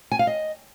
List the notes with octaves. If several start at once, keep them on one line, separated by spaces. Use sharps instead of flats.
G#5
F5
D#5